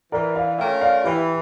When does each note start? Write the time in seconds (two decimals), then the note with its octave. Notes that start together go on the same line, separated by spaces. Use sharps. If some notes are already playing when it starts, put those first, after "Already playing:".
0.12 E3 A#4 D5
0.35 D5 F5
0.58 A3 C#4 F4 A#4 E5 G5
0.81 D5 F5
1.04 E3 E4 G4